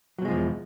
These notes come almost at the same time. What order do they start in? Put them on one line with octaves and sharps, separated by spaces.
F#3 B2 G#3 F3 E2